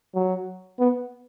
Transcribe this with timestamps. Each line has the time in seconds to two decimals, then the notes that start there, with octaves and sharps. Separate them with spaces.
0.15 F#3
0.79 B3